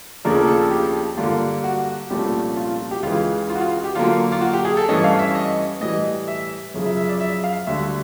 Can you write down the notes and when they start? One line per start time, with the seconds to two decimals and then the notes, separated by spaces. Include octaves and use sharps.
0.25 D#2 C#3 F3 A3 D4 A#4
0.47 A4
0.71 G4
1.17 G2 D3 G3 A#3 F4
1.64 F#4
2.10 C2 A#2 F3 A3 C#4 G4
2.57 F4
2.68 F4
2.91 G4
3.03 C#2 C#3 E3 F4
3.50 F4
3.55 F#4
3.61 F4
3.84 G4
3.95 D3 F#3 A#3 F4
4.32 F4
4.41 F#4
4.54 G4
4.65 G#4
4.77 A4
4.88 G2 E3 A3 C#4 D#5
5.04 F5
5.19 E5
5.35 D#5
5.81 A2 E3 G3 D#5
6.28 E5
6.74 F#2 C#3 F3
6.86 E5
6.97 E5
7.09 D5
7.20 E5
7.44 F5
7.67 D2 D3 G3 E5